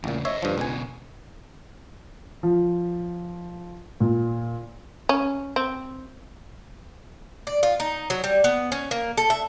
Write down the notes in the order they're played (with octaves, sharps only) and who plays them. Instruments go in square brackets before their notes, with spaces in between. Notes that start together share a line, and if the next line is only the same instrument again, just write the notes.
[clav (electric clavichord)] A1 A#2 [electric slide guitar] E2 C#3
[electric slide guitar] C5 D#5 [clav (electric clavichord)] C#5 E5
[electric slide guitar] E2 D3 D4 [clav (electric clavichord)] G2 F3
[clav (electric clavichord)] C#2 G#5 [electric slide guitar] B2 D3
[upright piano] F3
A#2
[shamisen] C#4
C4
[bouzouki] D5
F4
D#4
F#3
G3
B3
C#4
A#3
A4
E5